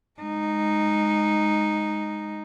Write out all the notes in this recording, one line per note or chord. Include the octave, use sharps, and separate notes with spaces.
G#3 D#4